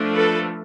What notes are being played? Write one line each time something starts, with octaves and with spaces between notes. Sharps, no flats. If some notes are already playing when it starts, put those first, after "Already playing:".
Already playing: F3 A3 D4
A4 B4